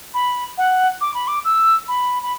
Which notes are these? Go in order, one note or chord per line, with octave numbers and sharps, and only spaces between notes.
B5
F#5
D6
B5
D6
E6
B5
B5